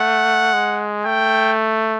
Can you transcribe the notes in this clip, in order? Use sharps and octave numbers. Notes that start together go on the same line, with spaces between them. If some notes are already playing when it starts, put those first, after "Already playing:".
Already playing: A3 F#5
G#3
A3 G5